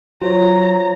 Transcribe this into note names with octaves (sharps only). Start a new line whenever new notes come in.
F#3 F4 C5 C#5 A#5